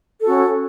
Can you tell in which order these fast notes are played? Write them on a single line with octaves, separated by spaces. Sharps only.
A4 F#4 C#4